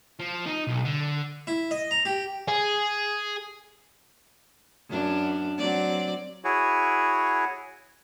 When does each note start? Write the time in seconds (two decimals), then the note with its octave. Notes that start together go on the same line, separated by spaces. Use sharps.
0.19 F3
0.46 D#4
0.67 B1
0.85 D3
1.47 E4
1.71 D#5
1.91 A#5
2.05 G4
2.48 G#4
4.89 F#2 D4
5.58 F#3 C4 D5
6.44 E4 F#4 G#4 C#5